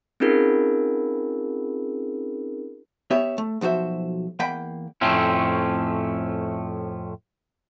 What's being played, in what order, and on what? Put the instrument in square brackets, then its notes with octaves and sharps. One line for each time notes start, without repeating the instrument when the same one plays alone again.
[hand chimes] C4 C#4 D#4 F4 G#4 A#4
[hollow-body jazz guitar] B3 G4 C#5 E5
A3
B1 F3 F#4 C5 E5
E2 A#3 F#5 G5 B5
[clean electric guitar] F2 A2 A3 C4 C#4